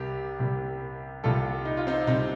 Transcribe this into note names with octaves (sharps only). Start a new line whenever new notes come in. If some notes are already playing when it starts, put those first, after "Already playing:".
Already playing: C2 C3 G3 G4 A#4
C2 C3 G3
C2 C3 G3 F4 A4
D#4
F4
C4 D#4
C2 C3 G3 C4 D#4